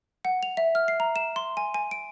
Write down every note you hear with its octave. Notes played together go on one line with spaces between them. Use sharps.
F#5
F7
E5
F6
C7
A#5
E7
C6
G#5
G#5
D7